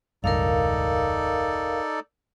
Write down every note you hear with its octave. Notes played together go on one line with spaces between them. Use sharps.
E1 C#2 G2 D#4 A4 A#4 D5 F5